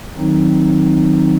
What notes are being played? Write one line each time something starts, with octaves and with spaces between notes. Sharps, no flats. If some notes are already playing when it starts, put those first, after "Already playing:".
D#3 F#3 C4 D#4